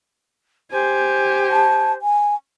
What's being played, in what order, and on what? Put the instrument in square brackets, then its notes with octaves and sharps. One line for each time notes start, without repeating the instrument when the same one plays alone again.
[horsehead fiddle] G4 G#5 [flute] C5
[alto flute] A5
G#5